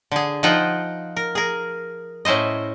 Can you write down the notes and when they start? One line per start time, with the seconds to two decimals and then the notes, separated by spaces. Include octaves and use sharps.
0.12 D3 G#4
0.43 F3 D#4 F4 F#5 G5
1.17 A#4
1.35 G#4 A#4
2.25 A2 C#4 E4 C5 D#5